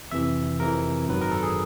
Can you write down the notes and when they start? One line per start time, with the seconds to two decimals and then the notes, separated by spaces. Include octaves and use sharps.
0.11 F2 C3 E3 E5
0.60 F2 C3 E3 A#4
1.07 G#1 F#2 D#3 F#3 B4
1.21 A#4
1.31 A4
1.43 G#4